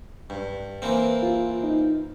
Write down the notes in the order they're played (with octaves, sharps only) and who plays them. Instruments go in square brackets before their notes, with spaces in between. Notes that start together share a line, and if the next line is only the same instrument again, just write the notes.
[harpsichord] G2
E3 A#3 C4
[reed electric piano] F4
D#4